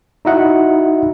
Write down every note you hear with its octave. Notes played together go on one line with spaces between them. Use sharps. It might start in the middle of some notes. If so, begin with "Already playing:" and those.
D#4 E4 F#4 D#5 E5 F#5